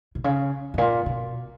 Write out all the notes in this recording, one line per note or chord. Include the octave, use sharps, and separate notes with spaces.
B2
C#3
G2
A#2
B2